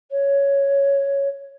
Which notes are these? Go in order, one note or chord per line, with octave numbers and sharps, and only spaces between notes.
C#5